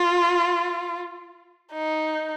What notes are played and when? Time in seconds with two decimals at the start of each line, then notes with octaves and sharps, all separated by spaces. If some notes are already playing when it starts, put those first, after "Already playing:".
Already playing: F4
1.73 D#4